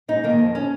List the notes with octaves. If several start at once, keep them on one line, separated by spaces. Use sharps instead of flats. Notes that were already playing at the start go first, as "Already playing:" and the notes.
G#2 D#4
D#3 A#3
F2
C#4